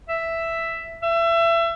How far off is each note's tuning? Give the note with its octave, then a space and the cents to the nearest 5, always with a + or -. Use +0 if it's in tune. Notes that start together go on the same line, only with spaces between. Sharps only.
E5 +5
E5 +30